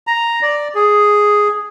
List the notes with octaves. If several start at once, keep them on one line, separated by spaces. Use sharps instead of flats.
A#5
D5
G#4